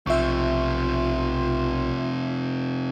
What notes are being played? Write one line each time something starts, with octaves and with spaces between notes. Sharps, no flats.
B1 C3 F3 F4 E5 C#6